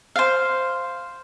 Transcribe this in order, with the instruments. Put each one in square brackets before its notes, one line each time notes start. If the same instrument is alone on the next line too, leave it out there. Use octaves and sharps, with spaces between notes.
[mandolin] C5 F5